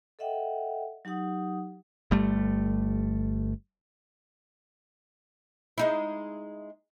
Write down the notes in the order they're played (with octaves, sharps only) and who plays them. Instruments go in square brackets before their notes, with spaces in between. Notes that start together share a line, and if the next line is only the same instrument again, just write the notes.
[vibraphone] A4 D#5 E5 F#5 G5
F#3 D#4 G4 F#5 D#6
[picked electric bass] G1 G3 A3
[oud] G#3 D#4 E4